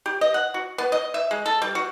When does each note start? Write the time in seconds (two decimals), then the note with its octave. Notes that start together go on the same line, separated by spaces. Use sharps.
0.06 G4
0.21 D#5
0.34 F#5
0.54 F#4
0.78 B3
0.92 D#5
1.14 E5
1.31 G#3
1.46 A4
1.62 G3
1.75 F#4